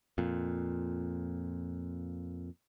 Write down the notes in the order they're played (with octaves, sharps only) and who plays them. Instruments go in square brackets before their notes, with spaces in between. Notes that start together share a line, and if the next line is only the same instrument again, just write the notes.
[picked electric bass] F2 A#2